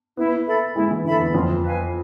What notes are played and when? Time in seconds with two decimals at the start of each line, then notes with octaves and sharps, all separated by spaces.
0.16 B3 E4
0.46 A4 E5 B5
0.75 G#3 E4
0.91 E3
1.05 D3 A4 E5 B5
1.19 E2
1.34 F2 F4
1.63 B4 F5 G#5